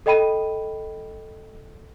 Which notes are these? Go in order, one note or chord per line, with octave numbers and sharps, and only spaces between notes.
A4 D#5 G5 B5 D#7